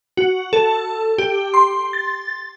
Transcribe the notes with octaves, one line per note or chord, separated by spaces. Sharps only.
F#4
A4
G4
C6
A6